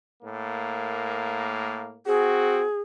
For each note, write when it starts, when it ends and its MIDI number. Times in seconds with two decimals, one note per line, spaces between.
0.23 1.98 45
0.23 1.98 58
2.06 2.65 60
2.06 2.65 66
2.06 2.80 68